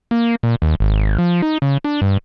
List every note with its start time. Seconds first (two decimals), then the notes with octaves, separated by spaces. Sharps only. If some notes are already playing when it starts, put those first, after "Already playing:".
0.11 A#3
0.43 A#2
0.62 D#2
0.80 G#1
1.18 F3
1.42 D#4
1.62 C#3
1.84 D4
2.02 G2